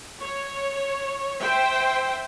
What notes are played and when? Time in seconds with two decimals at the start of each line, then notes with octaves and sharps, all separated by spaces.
0.21 C#5
1.41 C5 E5 G5